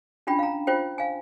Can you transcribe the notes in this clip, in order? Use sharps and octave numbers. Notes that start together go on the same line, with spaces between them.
C#4 D4 F4 G5 B5
F5 A#5
F4 C5 G5
F5 G#5